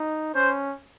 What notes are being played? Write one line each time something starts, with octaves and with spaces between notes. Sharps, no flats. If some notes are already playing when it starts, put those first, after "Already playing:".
Already playing: D#4
C#4 C5